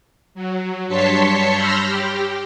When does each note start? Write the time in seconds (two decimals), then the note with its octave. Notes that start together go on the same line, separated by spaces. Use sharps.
0.35 F#3
0.88 G2 C#5 A5 C6 B6 C#7
1.55 B5 C6 E6 F6 G6 A#6
1.86 G4